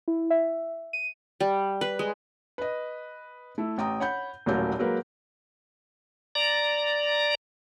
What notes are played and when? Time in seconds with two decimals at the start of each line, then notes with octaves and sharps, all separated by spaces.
0.08 E4
0.30 E5
0.93 D#7
1.40 G3
1.81 B4
1.99 G#3
2.58 B4 D#5
3.58 A3 E4
3.78 A1 G5 A#5 D#6
4.00 C#5 F#5 B5 G6
4.46 D#1 A1 A#2 F#3 A#3 G6
4.79 F#3 G#3 A#3 A#4 B4
6.35 D5 A#5